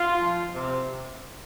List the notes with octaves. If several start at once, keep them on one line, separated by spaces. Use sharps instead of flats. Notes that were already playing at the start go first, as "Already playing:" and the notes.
Already playing: F4
F3
C3